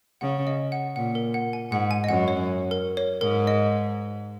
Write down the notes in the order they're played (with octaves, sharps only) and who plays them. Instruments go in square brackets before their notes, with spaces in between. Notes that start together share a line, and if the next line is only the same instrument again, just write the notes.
[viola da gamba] C#3 [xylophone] F#5
[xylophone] D#5
F#5
[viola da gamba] A#2 [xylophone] F#5
[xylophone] A#4
F#5
G#5
[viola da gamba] G#2 [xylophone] F#5
[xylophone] G#5
D#5
[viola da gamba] F#2 [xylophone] F#5
[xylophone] C#5
A#4
C#5
[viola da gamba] G#2 [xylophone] A#4
[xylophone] D#5